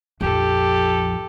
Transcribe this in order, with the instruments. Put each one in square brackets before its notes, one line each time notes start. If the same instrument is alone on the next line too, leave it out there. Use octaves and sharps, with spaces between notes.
[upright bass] A#1 F2 [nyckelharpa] G4 A4